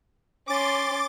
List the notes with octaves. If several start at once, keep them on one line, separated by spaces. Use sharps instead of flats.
C#4 C6 D6 A6